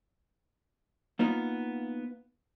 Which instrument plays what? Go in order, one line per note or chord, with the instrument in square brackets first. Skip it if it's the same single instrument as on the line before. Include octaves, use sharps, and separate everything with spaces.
[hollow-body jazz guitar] A#3 B3 D#4 F4